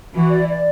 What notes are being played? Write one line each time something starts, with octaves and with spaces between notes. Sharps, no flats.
E3 F#4
D5
D5